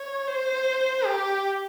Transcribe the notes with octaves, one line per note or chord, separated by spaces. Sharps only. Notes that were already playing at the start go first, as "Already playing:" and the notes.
Already playing: C#5
C5
G4